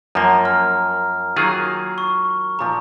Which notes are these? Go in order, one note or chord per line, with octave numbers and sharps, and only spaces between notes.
F#2 F3 A#3 A#5
F6
D#3 F#3 A#3 F4 G#4
C#6
A#2 F3 A#5